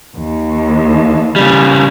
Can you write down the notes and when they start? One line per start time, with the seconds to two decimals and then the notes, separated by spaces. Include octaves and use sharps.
0.17 D#2
1.36 C#3 G3